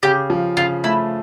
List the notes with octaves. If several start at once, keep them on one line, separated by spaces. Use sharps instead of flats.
C#3 G4
F3
C#3 F4
A3 E4